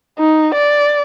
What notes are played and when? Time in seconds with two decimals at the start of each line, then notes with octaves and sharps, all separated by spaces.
0.19 D#4
0.55 D5